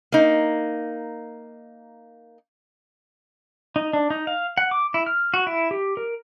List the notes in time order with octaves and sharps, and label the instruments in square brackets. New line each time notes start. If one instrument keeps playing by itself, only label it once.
[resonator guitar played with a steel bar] A#3 D#4
[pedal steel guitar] D#4
D4
D#4
F5
F#5
D6
E4
F6
F#4
E4
G4
A#4